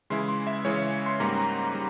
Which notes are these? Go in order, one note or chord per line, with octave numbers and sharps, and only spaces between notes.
C#3 E3 G#3 E4 C6
C6
E5
C#3 E3 G#3 E4 C#5
E5
C6
G#2 G3 A#3 C#4 A#5
G3